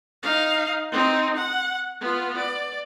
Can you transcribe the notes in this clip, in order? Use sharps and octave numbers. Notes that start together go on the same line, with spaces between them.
D#4 F5
C4 D#4
F#5
B3 F4
D5